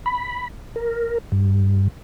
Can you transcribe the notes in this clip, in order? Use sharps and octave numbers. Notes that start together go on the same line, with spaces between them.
B5
A#4
G2